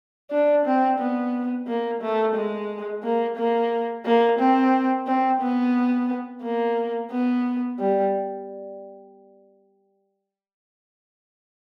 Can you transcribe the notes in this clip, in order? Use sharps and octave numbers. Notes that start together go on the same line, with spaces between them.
D4
C4
B3
A#3
A3
G#3
A#3
A#3
A#3
C4
C4
B3
A#3
B3
G3